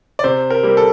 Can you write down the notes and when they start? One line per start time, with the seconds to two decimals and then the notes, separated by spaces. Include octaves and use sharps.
0.19 D5
0.24 C3 C5
0.50 A#4
0.63 G3 A#3
0.77 A4